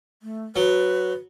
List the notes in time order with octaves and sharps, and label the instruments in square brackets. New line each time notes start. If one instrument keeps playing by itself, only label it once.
[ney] A3
[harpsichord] F#3 [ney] B4